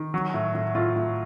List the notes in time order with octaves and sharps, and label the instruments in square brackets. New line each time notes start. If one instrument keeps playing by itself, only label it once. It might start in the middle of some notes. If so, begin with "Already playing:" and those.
Already playing: [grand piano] D#3
F#3
A2
A2
A2 F4
A2